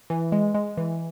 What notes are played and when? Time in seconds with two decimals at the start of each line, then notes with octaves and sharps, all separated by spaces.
0.10 E3
0.32 G#3
0.54 G#3
0.77 E3